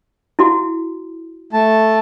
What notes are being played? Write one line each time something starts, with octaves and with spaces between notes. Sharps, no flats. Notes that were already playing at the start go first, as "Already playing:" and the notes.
E4 F#4
A3 A5